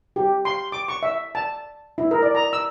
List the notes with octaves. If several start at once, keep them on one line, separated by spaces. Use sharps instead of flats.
G4
C6
D6
C#6
E5
A5
E4
A#4
D5
A#5
E6